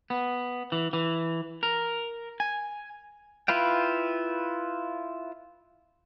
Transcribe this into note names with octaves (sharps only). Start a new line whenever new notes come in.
B3
E3
E3
A#4
G#5
E4 F4 B4 F5 G5